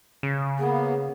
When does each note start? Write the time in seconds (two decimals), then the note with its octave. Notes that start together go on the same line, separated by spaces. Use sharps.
0.23 C#3
0.59 A#3 B3 G#4